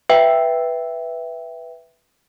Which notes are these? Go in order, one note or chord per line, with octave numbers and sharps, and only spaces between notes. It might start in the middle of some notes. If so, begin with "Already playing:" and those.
B4 E5 G5